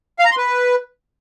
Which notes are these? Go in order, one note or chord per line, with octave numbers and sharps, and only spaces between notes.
F5
A#5
C6
B4